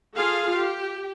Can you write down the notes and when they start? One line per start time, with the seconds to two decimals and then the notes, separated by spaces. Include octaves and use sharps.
0.15 F4 G#4 A4 F5
0.55 G4